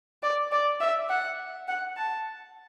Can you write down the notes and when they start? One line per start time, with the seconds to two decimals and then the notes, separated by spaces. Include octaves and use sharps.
0.23 D5
0.52 D5
0.81 E5
1.09 F#5
1.68 F#5
1.97 A5